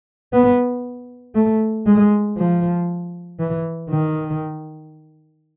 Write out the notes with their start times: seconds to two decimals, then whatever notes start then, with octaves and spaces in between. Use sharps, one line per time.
0.33 B3
1.35 A3
1.86 G#3
2.38 F3
3.40 E3
3.90 D#3